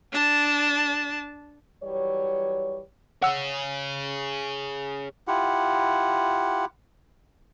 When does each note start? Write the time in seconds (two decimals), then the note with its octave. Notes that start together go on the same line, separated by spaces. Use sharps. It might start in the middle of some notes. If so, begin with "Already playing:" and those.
0.12 D4 A5
1.84 E3 F#3 G3 C#5
3.22 G#4 C#5 F#5 E6
5.28 E4 F4 G4 F#5